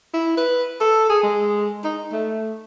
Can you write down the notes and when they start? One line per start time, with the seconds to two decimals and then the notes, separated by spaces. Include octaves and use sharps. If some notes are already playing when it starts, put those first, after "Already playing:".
0.14 E4
0.38 B4
0.81 A4
1.10 G#4
1.24 G#3
1.85 D#4
2.13 A3